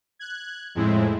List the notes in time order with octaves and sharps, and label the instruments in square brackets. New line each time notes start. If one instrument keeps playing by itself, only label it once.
[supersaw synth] F#6 G#6
F2 A2 G#3 C4 E4